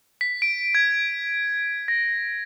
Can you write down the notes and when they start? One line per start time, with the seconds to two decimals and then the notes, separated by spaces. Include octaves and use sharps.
0.21 B6
0.42 D7
0.75 G#6
1.88 A#6